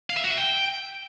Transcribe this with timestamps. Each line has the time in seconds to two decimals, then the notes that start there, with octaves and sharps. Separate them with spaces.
0.10 F5
0.17 E5
0.24 F#4
0.31 E5
0.38 G5